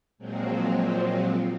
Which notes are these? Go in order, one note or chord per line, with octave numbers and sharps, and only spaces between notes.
A#2 F3 F#3 G#3 C4